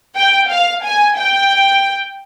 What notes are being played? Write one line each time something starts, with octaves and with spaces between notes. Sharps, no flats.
G5
F5
G#5
G5